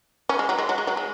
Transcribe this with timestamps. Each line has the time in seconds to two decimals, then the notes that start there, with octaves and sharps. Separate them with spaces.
0.29 C#4
0.39 G#3
0.49 F#3
0.59 G#3
0.69 F#3
0.78 G#3
0.87 F#3
0.97 G#3